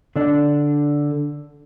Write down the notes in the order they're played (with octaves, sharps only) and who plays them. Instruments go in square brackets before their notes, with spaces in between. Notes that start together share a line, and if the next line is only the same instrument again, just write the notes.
[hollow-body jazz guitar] D3 D4